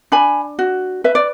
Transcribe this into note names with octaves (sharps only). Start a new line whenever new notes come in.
D4 G#5 B5
F#4
B4 E5
D5